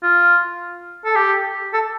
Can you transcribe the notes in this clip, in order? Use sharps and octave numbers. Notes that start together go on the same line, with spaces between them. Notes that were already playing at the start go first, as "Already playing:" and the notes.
F4
A4
G4
A4